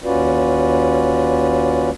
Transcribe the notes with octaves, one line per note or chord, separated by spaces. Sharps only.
D#2 C#4 F4 F#4 B4 D5